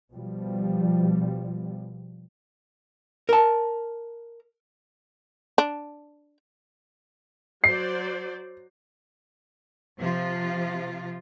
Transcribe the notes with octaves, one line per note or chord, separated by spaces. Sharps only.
B2 F3 G3
A#4 A5
D4
F#3 C5 D5 C7
C3 F3 F4